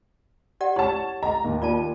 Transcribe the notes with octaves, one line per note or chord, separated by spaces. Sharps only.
G4 D5 F#5
E4 C#5 A5
D#5 A#5
D#2
F4 D5 A5